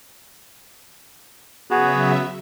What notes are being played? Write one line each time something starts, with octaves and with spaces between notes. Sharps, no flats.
C#3 F#3 B3 F#4 G#4 E5